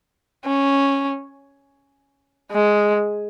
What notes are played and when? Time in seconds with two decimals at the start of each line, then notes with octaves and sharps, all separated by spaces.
0.45 C#4
2.52 G#3